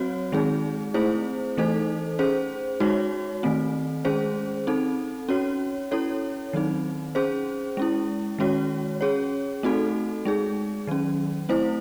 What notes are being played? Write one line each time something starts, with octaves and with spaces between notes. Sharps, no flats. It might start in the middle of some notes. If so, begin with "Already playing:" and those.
Already playing: F#3 C4 F#4 C#5
D#3 G#3 C4 D#4 G#4
A3 C4 E4 G#4 C5
E3 A3 D#4 A4 C5
C#4 G#4 C5
G#3 D#4 F#4 C#5
D#3 A3 C4
D#3 G#3 C#4 G#4 C5
C4 D#4 A4
C#4 F#4 C#5
C#4 E4 A4 C#5
D#3 F#3 C4 D#4
C#4 G#4 C5
G#3 C#4 E4
D#3 G#3 C#4 F#4 C#5
C#4 G#4 C#5
A3 C4 D#4 F#4 A4
G#3 D#4 G#4
D#3 F#3 C#4
A3 C4 E4 C5